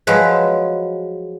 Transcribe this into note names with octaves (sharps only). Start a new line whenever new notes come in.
F3 F#3 G#3 B4